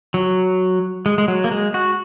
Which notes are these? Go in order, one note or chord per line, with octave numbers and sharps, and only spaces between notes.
F#3
G#3
G#3
F#3
A#3
G#3
F#4